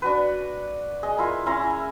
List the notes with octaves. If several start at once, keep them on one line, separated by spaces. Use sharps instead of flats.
D4 F#4 B4
G#4 D#5
A#3 E4 F4
C#4 E4 F5 A#5